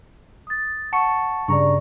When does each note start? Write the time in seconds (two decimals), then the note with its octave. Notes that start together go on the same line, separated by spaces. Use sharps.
0.47 D#6 A6
0.93 F#5 A5 C#6 C#7
1.48 G2 C#3 D5 A#5 C#6